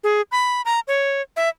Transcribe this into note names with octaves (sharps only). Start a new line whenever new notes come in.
G#4
B5
A#5
C#5
E5